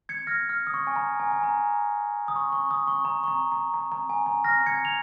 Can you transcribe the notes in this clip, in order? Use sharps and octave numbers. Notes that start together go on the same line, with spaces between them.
G#6 C#7
F6 A#6
F6
D#6
C#6
G#5
A#5
G#5
G#5
A#5
D#6
C#6
C#6
D#6
C#6
A#5
C#6
A#5
A#5
A#5
A#5
G#5
A#5
F6 A#6
A#6
G#6 C#7
F7